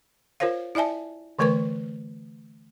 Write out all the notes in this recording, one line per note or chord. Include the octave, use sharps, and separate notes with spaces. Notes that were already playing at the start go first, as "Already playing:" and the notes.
F4 A#4 C5 C#5 F5
E4 D5 E5 G#5 A5
D3 E3 A3 A#4 B4 C#6